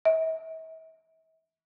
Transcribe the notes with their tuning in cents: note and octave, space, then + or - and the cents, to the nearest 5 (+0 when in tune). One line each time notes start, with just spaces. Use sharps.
E5 -45